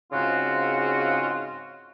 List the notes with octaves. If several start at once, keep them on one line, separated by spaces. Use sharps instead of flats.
G#2 C#3 C4 F4 F#4